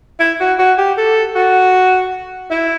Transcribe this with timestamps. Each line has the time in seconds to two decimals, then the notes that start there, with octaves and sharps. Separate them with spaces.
0.20 E4
0.40 F#4
0.59 F#4
0.78 G4
0.97 A4
1.36 F#4
2.51 E4